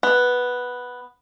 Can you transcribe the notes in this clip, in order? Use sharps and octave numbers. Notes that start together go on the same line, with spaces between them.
B3